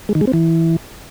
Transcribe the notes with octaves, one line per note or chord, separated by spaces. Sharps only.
G#3
D#3
G#3
C4
E3